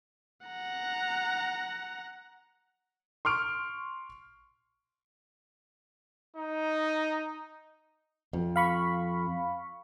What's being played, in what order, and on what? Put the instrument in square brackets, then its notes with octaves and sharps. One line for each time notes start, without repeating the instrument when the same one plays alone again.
[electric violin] F#5 A#5
[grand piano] C6 C#6 F6 D7
[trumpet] D#4
[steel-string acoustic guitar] F2
[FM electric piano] F5 B5 C#6